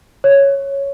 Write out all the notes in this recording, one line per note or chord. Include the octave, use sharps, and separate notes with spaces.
C#5